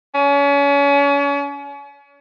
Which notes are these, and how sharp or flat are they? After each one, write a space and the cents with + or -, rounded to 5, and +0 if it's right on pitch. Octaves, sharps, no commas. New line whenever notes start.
C#4 +35